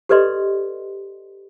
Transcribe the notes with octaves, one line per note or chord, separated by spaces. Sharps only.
G4 A4 B4 D5 D#5 C6